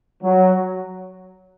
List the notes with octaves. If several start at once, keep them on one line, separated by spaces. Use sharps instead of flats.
F#3